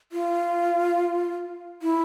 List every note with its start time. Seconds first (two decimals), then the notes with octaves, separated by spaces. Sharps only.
0.12 F4
1.82 E4